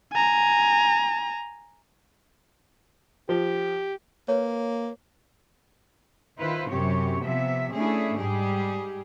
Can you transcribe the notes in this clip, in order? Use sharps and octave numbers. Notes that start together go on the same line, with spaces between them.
G#5 A#5
F3 G4
A#3 B4 C#5
D#3 E4 F4 B4 C5
F#2 C3 C4 G4 C#5
C3 F3 B3 E5
A3 C#4 D4 E4 G#4
G#2 G3 G4 G#4